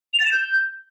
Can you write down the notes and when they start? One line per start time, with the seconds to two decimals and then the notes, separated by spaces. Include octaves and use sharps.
0.14 F7
0.20 A6
0.26 E7
0.32 G6